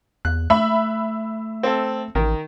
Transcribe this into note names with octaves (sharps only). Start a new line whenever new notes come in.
E2 F#6
A3 E5 B5
C4 A4
A1 D#3 A#4